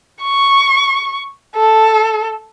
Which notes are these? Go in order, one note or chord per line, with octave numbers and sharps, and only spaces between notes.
C#6
A4